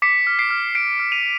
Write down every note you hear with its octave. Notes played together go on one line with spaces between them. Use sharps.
D6 B6 C#7
F6
C7 D7
F6
F6 C7 D7
F6
D#7 F7